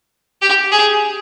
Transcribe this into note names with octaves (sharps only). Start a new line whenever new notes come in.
G4
G#4